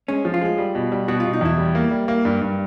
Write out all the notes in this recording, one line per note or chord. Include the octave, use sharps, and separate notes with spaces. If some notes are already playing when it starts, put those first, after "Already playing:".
G#3 C#4
F3
F4
G#3
G3
B2
G3
B2 F#4
F4
B2
D#4
E2 E4
G3
A#3
G3
A#3
G2
G2